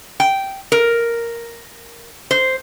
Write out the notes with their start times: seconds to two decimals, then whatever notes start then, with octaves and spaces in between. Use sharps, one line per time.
0.20 G5
0.72 A#4
2.31 C5